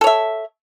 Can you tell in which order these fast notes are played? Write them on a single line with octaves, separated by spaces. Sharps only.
A4 C#5 E5